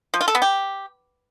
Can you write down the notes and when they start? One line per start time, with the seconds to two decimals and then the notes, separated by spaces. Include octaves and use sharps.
0.14 F3
0.21 F4
0.28 A4
0.35 B3
0.42 G4